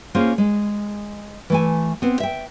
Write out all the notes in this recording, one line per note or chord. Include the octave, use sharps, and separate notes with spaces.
A#3 C#4 F4 G#4 C5
G#3
E3 A3 G#5
B3 C4
E5 G5